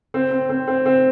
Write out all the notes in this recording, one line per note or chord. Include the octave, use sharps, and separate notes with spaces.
C4
C4
C4
C4
C4